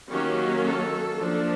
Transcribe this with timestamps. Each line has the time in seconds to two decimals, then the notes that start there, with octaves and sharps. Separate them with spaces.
0.10 D#3 F#3 A#3 C#4 G4
0.65 A4
1.19 F3 A#3 D4